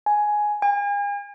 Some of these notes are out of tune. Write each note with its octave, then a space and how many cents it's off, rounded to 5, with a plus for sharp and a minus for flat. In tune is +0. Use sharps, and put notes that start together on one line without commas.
G#5 +10
G#5 -40